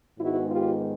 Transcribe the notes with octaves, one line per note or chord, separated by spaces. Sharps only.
G#2 D#3 G#3 B3 D#4 E4 F#4
F4 G4